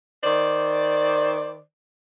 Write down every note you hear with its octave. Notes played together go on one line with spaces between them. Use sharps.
D#3 C5 D5